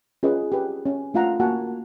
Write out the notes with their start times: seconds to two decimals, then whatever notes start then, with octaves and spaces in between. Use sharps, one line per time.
0.23 C#4 F4 G#4 B4 D#5
0.52 G4 B4
0.86 C#4
1.14 A3 D4 F4 F5 F#5 A#5
1.40 A#3 F#4 F#5 G#5 A5